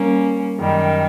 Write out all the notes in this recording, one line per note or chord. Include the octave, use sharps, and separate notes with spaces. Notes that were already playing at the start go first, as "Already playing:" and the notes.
Already playing: G3 A#3 C#4
F#2 D#3 G3